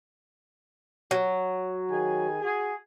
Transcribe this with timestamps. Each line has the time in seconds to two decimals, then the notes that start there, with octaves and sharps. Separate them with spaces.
1.11 F#3
1.90 D#3 G#4 G#5
2.42 F#4 G#4